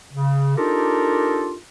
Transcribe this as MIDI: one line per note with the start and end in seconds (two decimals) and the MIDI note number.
0.12 0.53 49
0.57 1.55 62
0.57 1.55 63
0.57 1.55 65
0.57 1.55 67
0.57 1.55 69
0.57 1.55 70